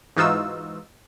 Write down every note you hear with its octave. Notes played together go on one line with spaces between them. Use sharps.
G#2 E3 D#4 F4 F#4 E6